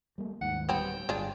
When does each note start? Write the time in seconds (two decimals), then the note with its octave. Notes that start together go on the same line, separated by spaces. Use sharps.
0.18 G3 A3 A#3
0.41 D#2 G#2 F#5
0.69 D1 G#1 G3 B3 C4 G5
1.09 G1 G#3 D4 F4